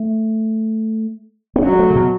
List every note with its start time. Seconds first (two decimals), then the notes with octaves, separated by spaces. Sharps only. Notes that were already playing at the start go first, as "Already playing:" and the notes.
Already playing: A3
1.56 B3
1.62 F#3 C#4
1.72 G3
1.79 A3
1.90 C#3
1.95 B2